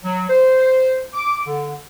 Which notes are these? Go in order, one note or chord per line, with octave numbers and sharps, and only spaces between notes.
F#3
C5
D6
D3